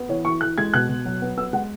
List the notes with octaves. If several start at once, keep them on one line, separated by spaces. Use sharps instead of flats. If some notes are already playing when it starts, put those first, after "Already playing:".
Already playing: B3
E3 C#5
E3 C#6
E3 F#6
G#3 G#6
B2 F#6
B2
F#3
B3
B3 E6
G#3 F#5